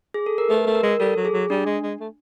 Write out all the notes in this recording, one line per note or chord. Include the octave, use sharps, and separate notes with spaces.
G#4
A4
A#4
A3 B4
A3
A#4
G#3
G3 A4
F#3
G#4
F#3
G3 D4
G#3
G#3
A3